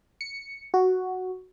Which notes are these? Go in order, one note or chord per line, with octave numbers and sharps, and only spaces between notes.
C#7
F#4